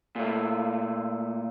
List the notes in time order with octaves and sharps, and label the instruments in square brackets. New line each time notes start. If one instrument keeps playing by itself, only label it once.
[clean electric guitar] A#2 A3